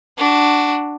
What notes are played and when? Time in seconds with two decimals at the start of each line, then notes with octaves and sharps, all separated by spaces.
0.18 D4 F#4